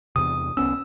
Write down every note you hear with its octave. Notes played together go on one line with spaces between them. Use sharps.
E2 C3 D#6
C2 B3 C#4 E6